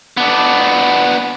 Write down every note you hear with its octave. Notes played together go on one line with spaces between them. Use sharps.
B3 D4